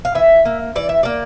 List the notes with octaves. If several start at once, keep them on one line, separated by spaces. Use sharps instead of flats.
F5
E3 E5
A#3
E3 D5
E5
A#3 D5